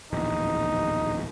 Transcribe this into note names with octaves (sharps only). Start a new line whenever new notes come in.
D1 A#1 E2 D#4